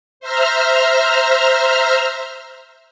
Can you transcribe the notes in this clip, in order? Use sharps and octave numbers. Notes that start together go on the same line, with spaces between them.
C5 E5 A#5 F6